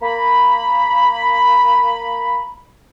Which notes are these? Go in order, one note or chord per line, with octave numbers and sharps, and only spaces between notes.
A#3 A#5 B5